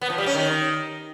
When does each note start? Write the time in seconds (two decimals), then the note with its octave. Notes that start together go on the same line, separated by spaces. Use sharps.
0.01 B3
0.10 F3
0.18 G3
0.26 C#4
0.35 D#3